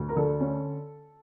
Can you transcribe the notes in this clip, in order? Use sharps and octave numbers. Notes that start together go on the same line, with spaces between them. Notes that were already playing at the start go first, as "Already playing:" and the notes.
Already playing: D2 A3
A#4
D3 A4
C#4